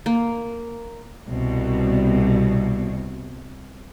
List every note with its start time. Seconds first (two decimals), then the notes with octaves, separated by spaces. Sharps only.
0.06 A#3
1.28 C2 B2